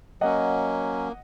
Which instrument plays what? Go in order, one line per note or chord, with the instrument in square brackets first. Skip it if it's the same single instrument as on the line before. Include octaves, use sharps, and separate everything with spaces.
[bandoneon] F#3 A#3 C#4 [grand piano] D#5 F#5